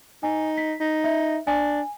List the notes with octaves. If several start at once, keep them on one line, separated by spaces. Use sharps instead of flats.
D#4 G#5
B6
D#4
E5
D4 G#5